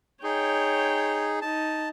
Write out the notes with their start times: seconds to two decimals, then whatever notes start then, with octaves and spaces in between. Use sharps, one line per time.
0.23 D#4 G#4 C#5 G5
1.41 D#4 A5